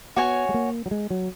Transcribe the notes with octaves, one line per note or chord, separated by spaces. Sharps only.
B3 F#4 C#5 G#5
G#3
A#3
F#3
G#3
F#3